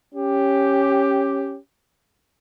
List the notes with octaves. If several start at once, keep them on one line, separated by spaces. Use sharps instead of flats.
C#4 G4